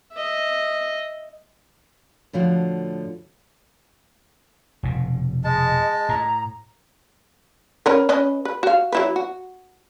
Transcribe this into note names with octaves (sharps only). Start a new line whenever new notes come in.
D#5 E5
A2 D3 F3 F#4
F1 B2
G#3 D#5 A5
A2 A#5
C#4 A#4 B4
C#4 B4 D#5
B4
F#4 F5
F#3 E4 B4
F#4